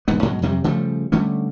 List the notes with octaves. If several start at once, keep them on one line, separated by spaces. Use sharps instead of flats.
E1 G#2 B3
G#2 B2 F#3
F2 C3 F#3 G3
C#3 F3 G3 A3
D3 G3 A3 C#4